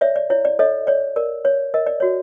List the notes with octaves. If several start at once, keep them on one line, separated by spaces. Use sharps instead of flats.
C#5 D5 E5
D5
E4 C#5
D5
A4 C#5 D#5
C#5 D5
A#4 D5
C#5
A#4 D#5
D5
F#4 C#5